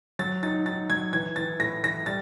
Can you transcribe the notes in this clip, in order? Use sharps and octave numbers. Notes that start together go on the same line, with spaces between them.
F#3 A6
D#4 A6
D#4 A6
F#3 G#6
E3 G#6
E3 A6
A2 A#6
E3 A#6
G3 A6